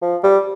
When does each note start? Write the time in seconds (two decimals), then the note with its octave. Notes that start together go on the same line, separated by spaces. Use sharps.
0.02 F3
0.23 G3